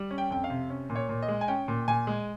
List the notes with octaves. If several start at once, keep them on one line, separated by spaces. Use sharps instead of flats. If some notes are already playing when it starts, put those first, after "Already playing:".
Already playing: G3
C#4
G5
F2 G5
F5
C3
C#4
A#2
C#5
A#2
D#5
G#3
G#5
C#4 G5
A#2
A#2 G#5
G#3